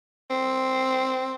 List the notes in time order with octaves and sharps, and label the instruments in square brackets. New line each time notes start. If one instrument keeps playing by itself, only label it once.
[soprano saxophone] C4